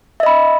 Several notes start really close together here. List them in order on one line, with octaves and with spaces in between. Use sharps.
E5 D#5 B5